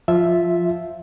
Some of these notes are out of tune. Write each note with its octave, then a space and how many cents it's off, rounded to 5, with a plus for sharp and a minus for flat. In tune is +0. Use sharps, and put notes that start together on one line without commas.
F3 +0 F4 +0 E5 +0